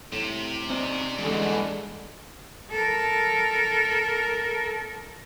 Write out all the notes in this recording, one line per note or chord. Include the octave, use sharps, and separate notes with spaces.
A2 C3
C4 C#4 D#4 D5
E2 A#2 D3 E3 G3 G#3
A4 A#4